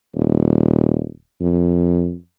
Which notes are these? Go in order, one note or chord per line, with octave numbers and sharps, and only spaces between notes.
D#1
F2